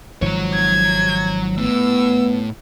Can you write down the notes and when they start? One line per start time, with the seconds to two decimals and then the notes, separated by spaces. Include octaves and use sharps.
0.22 G#1 G#2 F3 F#3 C#5
0.54 G#6
1.58 A2 B3 E6